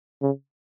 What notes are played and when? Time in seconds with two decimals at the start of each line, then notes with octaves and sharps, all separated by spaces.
0.22 C#3